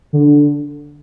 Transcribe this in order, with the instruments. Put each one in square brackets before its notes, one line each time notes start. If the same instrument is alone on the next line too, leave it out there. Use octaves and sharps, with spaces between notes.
[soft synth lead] D3